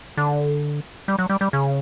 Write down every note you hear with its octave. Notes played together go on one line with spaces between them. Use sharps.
D3
G3
F#3
G3
G3
C#3